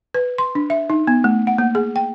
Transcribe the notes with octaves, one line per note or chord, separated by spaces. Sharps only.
B4
C6
D4
E5
D#4
B3
A3
F#5
A#3
G#4
G5